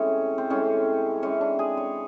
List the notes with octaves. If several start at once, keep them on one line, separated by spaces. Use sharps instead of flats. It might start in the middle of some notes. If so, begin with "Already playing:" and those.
Already playing: A2 E3 G#3 C4 C#4
C4
A2 E3 G#3 C4 C#4
E3 G#3 C4 C#4
D4
G#4
C#5